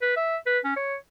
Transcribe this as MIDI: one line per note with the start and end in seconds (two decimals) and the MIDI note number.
0.02 0.16 71
0.16 0.37 76
0.46 0.59 71
0.64 0.75 61
0.76 0.96 73